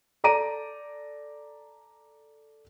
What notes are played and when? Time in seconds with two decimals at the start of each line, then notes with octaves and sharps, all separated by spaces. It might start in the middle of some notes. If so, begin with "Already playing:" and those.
0.24 A4 D5 A#5 D7 D#7